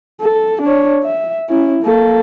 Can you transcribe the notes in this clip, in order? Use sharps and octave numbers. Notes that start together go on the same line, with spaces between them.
A4
D4 C#5
E5
C#4 E4
A#3 A4